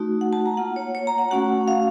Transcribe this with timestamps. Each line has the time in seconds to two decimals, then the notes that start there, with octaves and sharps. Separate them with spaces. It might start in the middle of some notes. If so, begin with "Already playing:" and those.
Already playing: A3 D#4 F#4
0.21 F#5
0.33 A5
0.46 A#5
0.57 A#3 F4 F#5
0.76 C#5
0.95 C#5
1.07 A#5
1.18 F#5
1.31 A3 C#4 F#4 F#5
1.68 F5